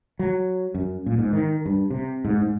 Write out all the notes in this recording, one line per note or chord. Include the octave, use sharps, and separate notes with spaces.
F#3
F#2
A#2
G#2
D#3
G2
C3
G#2
G#2